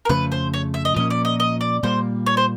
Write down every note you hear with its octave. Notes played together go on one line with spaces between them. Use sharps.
A#4
F2 C#3 F3 A3 B4
C5
C#5
E5
D#5
A#2 F3 A#3 C#4 D#5
D5
D#5
D#5
D5
A#2 G3 A#3 C5
C#5
C5